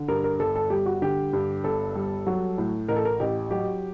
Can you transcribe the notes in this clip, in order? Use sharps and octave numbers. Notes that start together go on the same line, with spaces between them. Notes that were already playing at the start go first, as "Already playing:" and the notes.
Already playing: D3
G2 A#4
A#4
G1 A4
A4
G3 G4
F#4
D3 G4
G2
G1 A4
G3
F#3
A2
A1 A#4
A4
A#4
A1 G4
F#3 G4